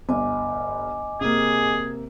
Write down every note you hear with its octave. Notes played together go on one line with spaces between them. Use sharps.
G1 D#5 G#5 D6
C3 A#3 G#4